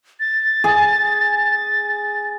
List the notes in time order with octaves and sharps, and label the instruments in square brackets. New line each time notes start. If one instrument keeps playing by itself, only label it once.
[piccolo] A6
[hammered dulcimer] G#4 G#5